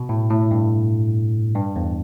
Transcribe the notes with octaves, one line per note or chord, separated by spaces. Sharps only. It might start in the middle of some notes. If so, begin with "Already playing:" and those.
Already playing: B2
A2
A2
G2
G2
E2